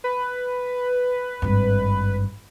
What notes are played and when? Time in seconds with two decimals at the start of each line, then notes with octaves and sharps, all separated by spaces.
0.04 B4
1.42 G#1 G2